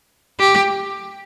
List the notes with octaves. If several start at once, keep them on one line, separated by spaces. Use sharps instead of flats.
G4